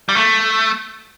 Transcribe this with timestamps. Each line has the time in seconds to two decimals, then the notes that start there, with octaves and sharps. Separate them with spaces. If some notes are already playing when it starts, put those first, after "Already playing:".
0.09 G3
0.15 A3